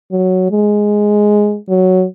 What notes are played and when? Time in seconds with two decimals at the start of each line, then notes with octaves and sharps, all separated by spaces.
0.11 F#3
0.51 G#3
1.69 F#3